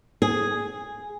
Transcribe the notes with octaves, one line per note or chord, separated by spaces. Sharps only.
G#4